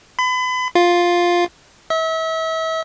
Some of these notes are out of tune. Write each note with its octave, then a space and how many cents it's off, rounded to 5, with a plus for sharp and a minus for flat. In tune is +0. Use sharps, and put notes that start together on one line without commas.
B5 +35
F4 +5
E5 -35